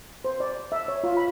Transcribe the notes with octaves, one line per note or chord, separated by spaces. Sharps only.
C5
D5
E5
C#5
F4
B5